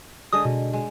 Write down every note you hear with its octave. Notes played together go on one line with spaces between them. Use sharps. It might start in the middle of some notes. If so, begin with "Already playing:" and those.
D3 G#3 D#5 D#6
B2
G#3